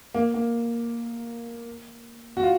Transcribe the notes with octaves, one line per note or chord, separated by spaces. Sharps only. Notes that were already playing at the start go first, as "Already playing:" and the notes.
A#3
A#3
F#4
F4